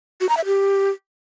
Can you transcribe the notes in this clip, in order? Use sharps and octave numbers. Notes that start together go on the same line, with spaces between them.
F#4
A#5
E5
G4